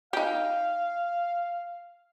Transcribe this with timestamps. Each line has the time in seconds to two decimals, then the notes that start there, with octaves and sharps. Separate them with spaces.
0.13 D#4 G4 F5